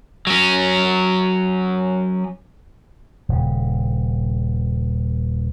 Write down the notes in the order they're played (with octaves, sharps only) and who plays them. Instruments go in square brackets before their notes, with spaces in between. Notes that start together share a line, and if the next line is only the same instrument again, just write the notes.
[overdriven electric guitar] F#3 C#4
[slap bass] D#1 C#3